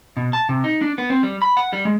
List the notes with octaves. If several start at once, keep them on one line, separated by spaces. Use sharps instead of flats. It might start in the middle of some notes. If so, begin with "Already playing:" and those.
B2
A5
C3
D#4
D4
B3
C4
G3
B5
F#5
G3
G#3